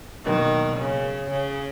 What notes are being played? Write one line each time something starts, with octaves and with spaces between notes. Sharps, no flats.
B2 D#3 F#3 A#3
C#3
C#3